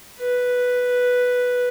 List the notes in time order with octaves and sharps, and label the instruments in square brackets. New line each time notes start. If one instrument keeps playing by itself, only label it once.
[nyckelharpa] B4